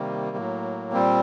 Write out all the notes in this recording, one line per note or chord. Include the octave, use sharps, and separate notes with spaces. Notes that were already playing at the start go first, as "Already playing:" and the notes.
Already playing: C3 D#3 G3 A#3
A2 F#3
A#2 G3 C4